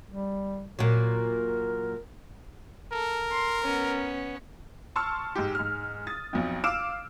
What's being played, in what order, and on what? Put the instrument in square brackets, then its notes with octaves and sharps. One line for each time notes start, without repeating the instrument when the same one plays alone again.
[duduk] G3
[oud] A#2 F#3 [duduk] A#4
[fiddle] A4 [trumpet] A#4
[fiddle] C6
B3 C#4
[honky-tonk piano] A5 C6 C#6 E6 F6
G#2 G4
G#2 F6
D#6 A6
B1 F2
F5 D6 E6 F6 D7 E7